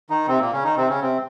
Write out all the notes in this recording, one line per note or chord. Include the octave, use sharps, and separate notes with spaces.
D#3 D#4
C3 C4
A#2 A#3
C#3 C#4
D#3 D#4
C3 C4
C#3 C#4
C3 C4